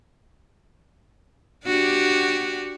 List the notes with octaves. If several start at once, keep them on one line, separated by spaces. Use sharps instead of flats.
D4 F#4 G4